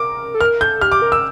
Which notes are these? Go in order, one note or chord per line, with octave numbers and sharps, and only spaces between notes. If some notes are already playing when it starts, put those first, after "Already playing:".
Already playing: A#4 D6
A4
A#4 F6
A4 G6
G4 F6
D6
A#4
E6